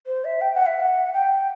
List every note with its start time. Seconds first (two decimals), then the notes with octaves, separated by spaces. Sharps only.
0.06 C5
0.24 E5
0.41 G5
0.54 F#5
0.66 E5
0.79 F#5
1.13 G5
1.31 G5